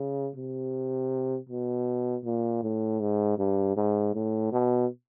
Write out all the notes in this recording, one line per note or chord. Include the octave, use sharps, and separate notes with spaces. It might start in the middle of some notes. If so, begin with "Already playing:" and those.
Already playing: C#3
C3
B2
A#2
A2
G#2
G2
G#2
A2
B2